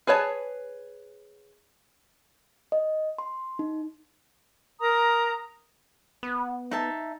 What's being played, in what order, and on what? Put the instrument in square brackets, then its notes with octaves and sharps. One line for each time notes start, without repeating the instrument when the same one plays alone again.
[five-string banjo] G#4 B4 C#5 G5 A5
[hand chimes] D#5
C6
D#4
[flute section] A#4 A#5 D#6
[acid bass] B3
[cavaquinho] D#4 E5 A5